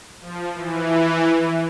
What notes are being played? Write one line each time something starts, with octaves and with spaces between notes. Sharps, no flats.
F3
E3